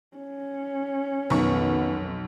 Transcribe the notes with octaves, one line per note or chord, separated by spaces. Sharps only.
C#4
B1 F2 D#3 B3 C#6